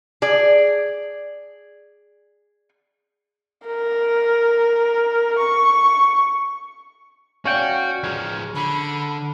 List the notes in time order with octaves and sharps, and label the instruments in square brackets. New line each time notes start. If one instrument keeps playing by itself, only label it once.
[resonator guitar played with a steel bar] G#4 D5
[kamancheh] A#4
C#6
[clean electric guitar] C#4 G5 [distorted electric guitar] F#4 [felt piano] C#5 D5 F5
[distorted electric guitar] F3 G#3 [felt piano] F6 G#6
[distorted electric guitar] D3 [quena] B5